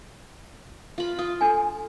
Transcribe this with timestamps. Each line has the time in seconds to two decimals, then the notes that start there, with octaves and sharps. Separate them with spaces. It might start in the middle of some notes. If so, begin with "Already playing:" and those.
0.98 F4 B5
1.19 F4 D#6
1.41 D4 A4 G#5